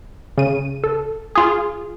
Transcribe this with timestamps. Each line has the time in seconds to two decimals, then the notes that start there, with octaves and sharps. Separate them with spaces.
0.38 C#3 D#7
0.84 A4
1.35 F4 G#4